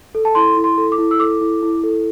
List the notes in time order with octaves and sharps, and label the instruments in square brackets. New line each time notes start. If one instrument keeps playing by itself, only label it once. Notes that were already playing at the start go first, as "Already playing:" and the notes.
[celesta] A4
A5
E4 C6
E4
C6
A4
D6
E4
E6
A4 D6
E4
E4
A4